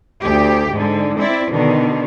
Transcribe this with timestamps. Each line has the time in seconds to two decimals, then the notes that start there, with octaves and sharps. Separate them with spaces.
0.22 D2 G4
0.73 G#2 D3
1.17 C4 E4 D5
1.52 B2 D3 D#3